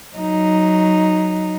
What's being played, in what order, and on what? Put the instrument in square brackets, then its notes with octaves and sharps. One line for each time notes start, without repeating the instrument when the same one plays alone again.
[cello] F#3 D#4